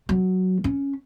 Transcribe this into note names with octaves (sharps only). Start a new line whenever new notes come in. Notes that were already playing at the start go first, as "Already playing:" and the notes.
F#3
C#4